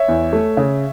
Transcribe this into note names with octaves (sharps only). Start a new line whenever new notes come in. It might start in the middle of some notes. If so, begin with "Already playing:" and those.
Already playing: C#5 E5
E2
A3
C#3